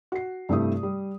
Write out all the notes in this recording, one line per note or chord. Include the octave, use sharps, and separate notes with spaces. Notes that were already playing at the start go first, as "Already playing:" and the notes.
F#4 C7
G2 C3 A3 E4 G4 D#6
G3